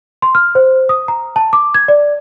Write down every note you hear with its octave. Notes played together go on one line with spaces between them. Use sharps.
C6
F6
C5
D#6
A#5
A5
D6
G#6
D5